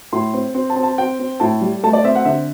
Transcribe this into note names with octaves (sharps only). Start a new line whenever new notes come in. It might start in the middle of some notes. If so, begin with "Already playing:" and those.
A2 C6
C4
C4
A5
C4
A5
C4 G5
C4
A2 A5
G3
A3 A5
D5
C4 E5
F#5
D3 E5